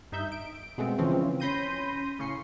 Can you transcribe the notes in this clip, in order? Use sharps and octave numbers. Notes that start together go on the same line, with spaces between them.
G2 D#4 E5 G6
D7
B2 G#3 A3 B3 C4
C#3 E3 F3 C4 C#4
C#4 B5 C6 G6 A#6 D#7
A2 C#3 C#6 C7